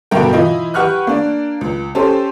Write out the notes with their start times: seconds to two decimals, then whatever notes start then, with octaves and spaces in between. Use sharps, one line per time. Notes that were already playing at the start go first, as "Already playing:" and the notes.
0.11 G2 B2 D3 F#4 A#4 G5
0.33 E3 E4 F4 D#5
0.74 G4 B4 F#5 C#6 F6 F#6
1.07 A#3 D4
1.61 C#2
1.95 C#4 G4 A4 C5